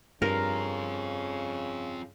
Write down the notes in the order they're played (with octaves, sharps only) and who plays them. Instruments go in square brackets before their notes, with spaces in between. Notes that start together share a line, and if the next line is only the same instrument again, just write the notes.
[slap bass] G2 [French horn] C#3 [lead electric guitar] C4 F4 [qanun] A#4